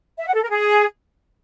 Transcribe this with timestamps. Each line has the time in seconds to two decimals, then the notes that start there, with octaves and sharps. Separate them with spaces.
0.19 E5
0.27 F#5
0.35 A4
0.43 A#4
0.51 G#4